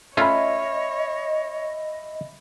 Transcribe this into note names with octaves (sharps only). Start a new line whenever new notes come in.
A3 C#4 F4 C#5 D#5 E5 B5